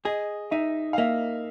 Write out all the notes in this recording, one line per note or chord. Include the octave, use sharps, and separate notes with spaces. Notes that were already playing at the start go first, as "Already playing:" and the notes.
G#4 D#5
D#4 E5
F5
A#3 E5